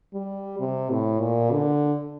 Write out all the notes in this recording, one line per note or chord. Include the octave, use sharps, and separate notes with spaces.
G3
C3
A2
A#2
D3